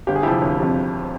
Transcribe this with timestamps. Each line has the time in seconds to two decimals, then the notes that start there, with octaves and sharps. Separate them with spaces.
0.07 G1 G4
0.16 G#4
0.23 F2 C3 F3 E4 G4
0.41 G1
0.58 F2 C3 F3